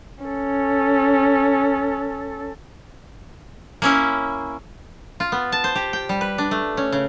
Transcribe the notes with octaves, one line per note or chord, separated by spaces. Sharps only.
C#4 A4
A#3 C#4 E4
F4
B3
A5
C5
G4
G5
G3
B4
D4
A3
C#4
C#3